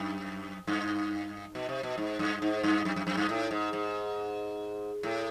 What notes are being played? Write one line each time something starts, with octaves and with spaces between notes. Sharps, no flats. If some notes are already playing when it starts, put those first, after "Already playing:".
Already playing: F#2
G2
B2
C3
B2
G#2
G2
G#2
G2
F#2
F#2
F#2
G2
A2
G#2
G#2
A2